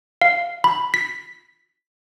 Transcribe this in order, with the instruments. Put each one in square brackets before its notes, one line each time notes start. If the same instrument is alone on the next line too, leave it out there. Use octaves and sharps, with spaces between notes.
[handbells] F5
B5
B6